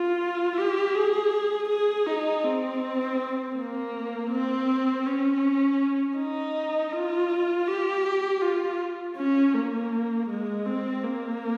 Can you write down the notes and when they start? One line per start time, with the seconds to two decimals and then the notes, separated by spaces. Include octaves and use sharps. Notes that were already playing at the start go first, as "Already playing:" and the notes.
Already playing: F4
0.57 G4
0.95 G#4
1.69 G#4
2.07 D#4
2.44 C4
3.56 A#3
4.31 C4
5.06 C#4
6.18 D#4
6.92 F4
7.68 G4
8.42 F4
9.17 C#4
9.54 A#3
10.29 G#3
10.66 C4
11.03 A#3